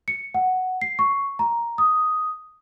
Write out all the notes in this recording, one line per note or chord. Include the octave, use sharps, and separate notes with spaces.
C#7
F#5
C7
C#6
A#5
D#6